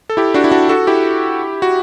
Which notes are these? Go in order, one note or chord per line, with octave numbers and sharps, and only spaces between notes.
A4
E4 G4
D4 F#4
E4
D4 F#4
F#4 A4
E4 G4
F#4